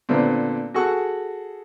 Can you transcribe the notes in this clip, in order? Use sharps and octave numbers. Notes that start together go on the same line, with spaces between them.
A#2 D3 B3 C4
F#4 G#4 A4 F#5 C#6